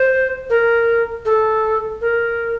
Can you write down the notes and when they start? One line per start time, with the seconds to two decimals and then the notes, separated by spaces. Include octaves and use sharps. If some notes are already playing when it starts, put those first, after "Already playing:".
Already playing: C5
0.50 A#4
1.25 A4
2.01 A#4